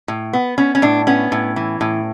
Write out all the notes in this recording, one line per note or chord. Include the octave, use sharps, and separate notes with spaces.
A2
B3
B3 C#4
C#4
A2 D4
B3 C#4
A2
E3
A2